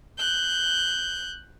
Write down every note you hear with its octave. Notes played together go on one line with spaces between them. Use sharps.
F#6 G6